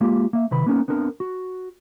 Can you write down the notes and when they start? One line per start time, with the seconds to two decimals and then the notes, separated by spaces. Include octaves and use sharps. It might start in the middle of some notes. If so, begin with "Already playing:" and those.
0.01 G#3 A#3 F4 G4
0.33 A#3 E5
0.51 C3 D#3 B4 B5
0.66 A#3 B3 C#4 D#4 A#4
0.88 B3 C4 D4 A#4
1.20 F#4